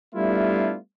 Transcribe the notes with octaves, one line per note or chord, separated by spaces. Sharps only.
G3 A3 B3 D4 E4 F4